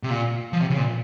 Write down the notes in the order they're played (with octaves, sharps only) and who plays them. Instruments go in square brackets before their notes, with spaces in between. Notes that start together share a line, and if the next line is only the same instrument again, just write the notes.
[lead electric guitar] C3
A#2
F3
C3
C#3
A#2